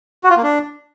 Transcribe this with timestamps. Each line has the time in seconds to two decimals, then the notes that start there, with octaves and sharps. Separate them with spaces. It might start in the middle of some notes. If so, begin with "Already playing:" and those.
0.24 F#4
0.30 F4
0.37 A#3
0.43 D4